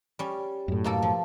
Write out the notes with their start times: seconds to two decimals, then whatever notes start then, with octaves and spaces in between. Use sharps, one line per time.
0.19 G3 C#4
0.68 F#2 A2
0.84 B2 A#3 A4
1.02 F3